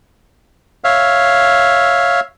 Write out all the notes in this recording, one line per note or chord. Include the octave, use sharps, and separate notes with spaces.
C#5 E5 F5